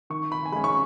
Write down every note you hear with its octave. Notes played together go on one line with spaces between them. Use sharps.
D#3 C#6
B5
G#5
G#3 C#4 B5
C#6